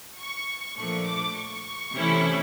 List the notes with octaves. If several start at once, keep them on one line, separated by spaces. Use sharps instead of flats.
C#6
A#2 F3 A3 D4 C#6
D6
C#6
C3 E3 A3 C#4 E4